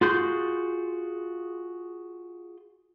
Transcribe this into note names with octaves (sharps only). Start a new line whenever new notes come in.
F4 F#4 G#4 C6 G6